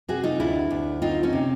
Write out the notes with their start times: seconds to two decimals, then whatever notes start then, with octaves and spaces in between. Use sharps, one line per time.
0.08 C3 F#4 G#4
0.23 D#4 F4
0.40 D2 D4 E4
0.70 D2
1.02 C4 D#4 F4
1.23 C#4 D#4
1.33 C3